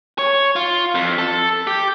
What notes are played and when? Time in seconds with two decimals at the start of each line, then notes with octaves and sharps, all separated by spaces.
0.18 C#5
0.56 F4
0.95 F2
1.18 A4
1.67 G4